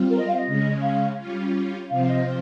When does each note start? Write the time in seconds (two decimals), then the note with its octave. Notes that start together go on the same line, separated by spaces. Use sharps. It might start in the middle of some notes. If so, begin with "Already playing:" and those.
Already playing: G3 C4 F4
0.10 A#4
0.18 D#5
0.28 F5
0.37 D#5
0.46 C#3 G#3 C#4
0.82 F5
1.18 G3 C#4 F4
1.90 C3 F3 C4 F4 F5
2.09 D#5